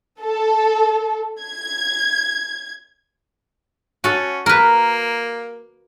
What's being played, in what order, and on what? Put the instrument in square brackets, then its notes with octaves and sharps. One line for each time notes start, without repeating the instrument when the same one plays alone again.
[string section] A4
G#6
[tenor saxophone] C#4 [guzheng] F#4 A4
[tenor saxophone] A#3 [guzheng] A#4 B4